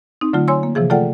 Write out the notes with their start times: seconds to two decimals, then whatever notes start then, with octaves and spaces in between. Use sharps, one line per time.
0.21 C4 D#4
0.33 D3 F#3 A3 F4
0.48 C#5 G#5 C6 E6
0.63 A#3
0.75 C3 E3 F3 G#4
0.90 A3 F4 A4 D5 F#5 G5